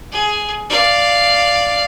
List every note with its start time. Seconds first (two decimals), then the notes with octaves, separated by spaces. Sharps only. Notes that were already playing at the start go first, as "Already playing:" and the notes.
0.12 G#4
0.70 D5 F5